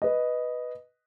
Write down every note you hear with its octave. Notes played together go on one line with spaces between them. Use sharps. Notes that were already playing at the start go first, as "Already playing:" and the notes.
B4 D#5